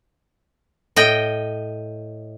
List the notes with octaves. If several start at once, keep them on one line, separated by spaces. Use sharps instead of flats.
A2 D#5 G5